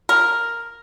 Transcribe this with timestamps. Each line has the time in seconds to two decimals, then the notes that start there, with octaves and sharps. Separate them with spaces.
0.09 A#4